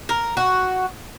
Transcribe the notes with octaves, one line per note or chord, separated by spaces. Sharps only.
A#4
F#4